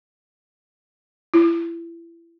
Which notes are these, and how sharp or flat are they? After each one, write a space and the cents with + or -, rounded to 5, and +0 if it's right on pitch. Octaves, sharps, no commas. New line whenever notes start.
E4 +30